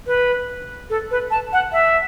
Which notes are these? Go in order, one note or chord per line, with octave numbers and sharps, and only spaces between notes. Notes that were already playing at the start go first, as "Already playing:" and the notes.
B4
A4
B4
A5
F#5
E5